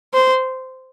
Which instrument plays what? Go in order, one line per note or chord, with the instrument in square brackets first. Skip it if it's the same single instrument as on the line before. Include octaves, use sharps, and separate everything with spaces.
[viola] C5